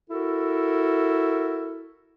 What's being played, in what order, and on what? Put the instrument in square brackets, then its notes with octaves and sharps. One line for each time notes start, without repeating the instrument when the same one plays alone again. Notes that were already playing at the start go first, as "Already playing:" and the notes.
[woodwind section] E4 F#4 A4 A#4